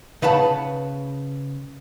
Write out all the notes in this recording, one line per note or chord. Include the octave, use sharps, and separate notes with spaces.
C#3 B4 F#5 A5 B5